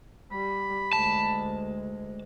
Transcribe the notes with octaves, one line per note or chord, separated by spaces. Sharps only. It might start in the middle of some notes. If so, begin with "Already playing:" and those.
G3 B5
D2 G#3 A5